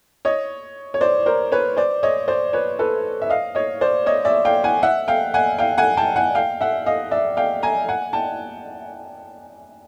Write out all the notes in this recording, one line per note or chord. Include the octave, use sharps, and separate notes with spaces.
C#5 D#5
C#5
C5 D5
A#4 C5
B4 C#5
C5 D5
C#5 D#5
C5 D5
B4 C#5
A4 B4
E5
D#5 F5
C#5 D#5
C5 D5
C#5 D#5
D5 E5
F5 G5
F#5 G#5
E5 F#5
F5 G5
F#5 G#5
F5 G5
F#5 G#5
G5 A5
F#5 G#5
F5 G5
E5 F#5
D#5 F5
D5 E5
F5 G5
G#5 A#5
F#5 G#5
G5 A5